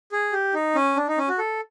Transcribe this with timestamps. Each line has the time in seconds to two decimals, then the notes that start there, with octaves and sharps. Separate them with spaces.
0.12 G#4
0.32 G4
0.54 D#4
0.75 C#4
0.96 D4
1.08 D#4
1.18 C#4
1.28 F#4
1.38 A4